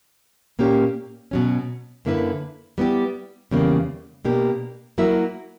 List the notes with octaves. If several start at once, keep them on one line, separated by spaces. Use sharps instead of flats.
A#2 A#3 C#4 G4
B2 F#3 C#4
F#2 D3 A#3 E4 B4
G3 B3 E4 G4
E2 C#3 G3 A#3
B2 A#3 D4 G4
F#3 A#3 E4 A#4 E5